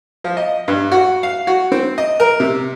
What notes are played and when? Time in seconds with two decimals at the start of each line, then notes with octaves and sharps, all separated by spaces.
0.24 F3
0.37 D#5
0.68 G2
0.91 F#4
1.23 F5
1.47 F#4
1.72 C4
1.98 D#5
2.20 A#4
2.40 C3